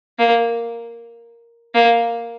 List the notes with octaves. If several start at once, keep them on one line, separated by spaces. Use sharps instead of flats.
A#3
A#3